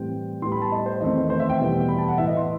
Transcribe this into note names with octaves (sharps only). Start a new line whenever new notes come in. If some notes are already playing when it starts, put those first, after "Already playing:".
Already playing: A2 E3 G3 C4 G5
A2 G3 B3 C6
B5
A5
D#5
C5
E2 D#3 A3 C4 D#5
C5
E5
G5
E2 B2 G3 B3
B5
A5
F#5
A2 E3 B3 E5
D#5
C6